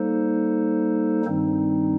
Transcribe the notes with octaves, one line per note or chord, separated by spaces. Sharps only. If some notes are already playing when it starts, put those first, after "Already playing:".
Already playing: G3 A#3 D#4 A4 C5
G2 D#3 G3 C4 D#4